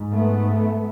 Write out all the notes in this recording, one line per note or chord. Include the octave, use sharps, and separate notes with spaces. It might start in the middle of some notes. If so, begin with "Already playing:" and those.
Already playing: G#2
A3 B3